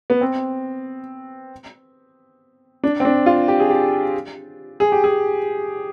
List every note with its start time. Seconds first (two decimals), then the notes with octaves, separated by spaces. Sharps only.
0.10 B3
0.21 C4
2.84 D4
3.00 C4
3.05 D4
3.26 F4
3.48 G4
3.60 G#4
3.70 G4
4.80 G#4
4.92 G4
5.04 G#4